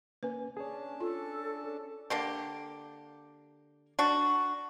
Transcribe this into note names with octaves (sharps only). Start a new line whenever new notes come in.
A#3 C#4 B4 G#5
C#4 D4 G#4 C#5 A5
F4 A4
D3 A#3 G4
D4 F#4